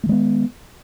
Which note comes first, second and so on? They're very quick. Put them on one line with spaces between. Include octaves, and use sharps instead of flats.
A3 D#3 G#3 B3